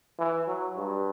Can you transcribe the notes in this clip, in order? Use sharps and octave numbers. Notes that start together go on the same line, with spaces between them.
E3
F#3
G2